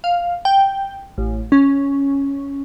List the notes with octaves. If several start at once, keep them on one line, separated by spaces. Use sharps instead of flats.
F5
G5
A1
C#4